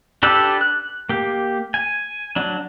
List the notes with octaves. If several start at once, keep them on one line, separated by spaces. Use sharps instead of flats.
D4 G4 A4 B4 D5
F#6
A#3 G4
G#5
F#3 D4